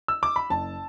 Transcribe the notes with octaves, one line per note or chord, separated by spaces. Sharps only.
E6
D6
B5
F#1 A5